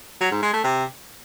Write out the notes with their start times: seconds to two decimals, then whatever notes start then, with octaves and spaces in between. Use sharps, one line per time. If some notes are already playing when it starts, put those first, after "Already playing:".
0.21 F#3
0.32 G#2
0.42 G#3
0.53 A3
0.64 C3